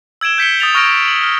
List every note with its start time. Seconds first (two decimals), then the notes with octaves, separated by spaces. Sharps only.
0.21 E6 G#6 D7 E7 G7
0.38 G6 B6 C#7 G7
0.60 D#6 A6 F7
0.75 C#6 F6 G#6 A#6 D7
1.08 F#7
1.23 F6